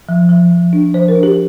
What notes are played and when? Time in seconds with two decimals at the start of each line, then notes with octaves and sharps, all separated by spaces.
0.09 F3
0.29 F3
0.51 F3
0.73 D4
0.94 F3 C5
1.08 A#4
1.15 D4
1.23 G4